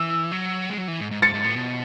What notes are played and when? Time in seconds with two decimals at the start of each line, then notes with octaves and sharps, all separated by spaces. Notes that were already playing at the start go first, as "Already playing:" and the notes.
Already playing: E3 E6
0.32 F#3
0.70 G#3
0.77 F#3
0.88 E3
1.00 G#2
1.11 G#2
1.22 G#2 A6 C#7
1.34 G#2
1.44 A2
1.56 B2